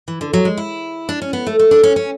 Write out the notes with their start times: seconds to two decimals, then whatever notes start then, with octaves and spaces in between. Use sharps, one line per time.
0.08 E3
0.21 D3
0.33 F#3
0.45 G#3
0.57 E4
1.09 D4
1.22 C#4
1.33 B3
1.47 A3
1.59 A3
1.71 D4
1.83 C#4
1.96 C#4